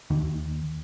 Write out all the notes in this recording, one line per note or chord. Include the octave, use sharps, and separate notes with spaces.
D#2